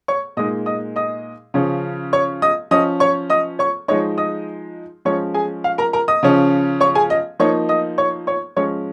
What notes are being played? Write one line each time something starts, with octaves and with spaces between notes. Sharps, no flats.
C#5 C#6
A#2 G#3 D#4 D#5 D#6
D#5 D#6
D#5 D#6
C#3 F3 C#4
C#5 C#6
D#5 D#6
F3 C#4 D#5 D#6
C#5 C#6
D#5 D#6
C#5 C#6
F3 G#3 D#4 C#5 C#6
D#5 D#6
F3 G#3 C#4 C#5 C#6
G#4 G#5
F5
A#4 A#5
A#4 A#5
D#5 D#6
C#3 F3 C#4
C#5 C#6
G#4 G#5
D#5
F3 A#3 D#4 C#5 C#6
D#5 D#6
C#5 C#6
C#5 C#6
F3 G#3 C#4 C#5 C#6